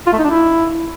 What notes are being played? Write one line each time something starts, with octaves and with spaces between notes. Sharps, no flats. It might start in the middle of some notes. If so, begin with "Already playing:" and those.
F4
A3
D#4
D4
E4